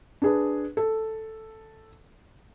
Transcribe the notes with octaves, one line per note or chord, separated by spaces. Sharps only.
D4 G#4 B4
A4